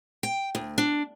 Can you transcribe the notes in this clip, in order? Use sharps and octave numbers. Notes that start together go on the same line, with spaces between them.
G5
D2
D4